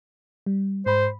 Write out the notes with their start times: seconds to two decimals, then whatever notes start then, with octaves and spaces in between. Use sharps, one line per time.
0.46 G3
0.86 G#2 C5 B5